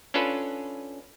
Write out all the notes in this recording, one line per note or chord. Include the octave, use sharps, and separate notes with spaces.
C#4 D4 F4 A4 B4